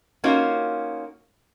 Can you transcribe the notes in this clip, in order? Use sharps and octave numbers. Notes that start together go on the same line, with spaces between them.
A#3 C#4 D#4 F4 F#4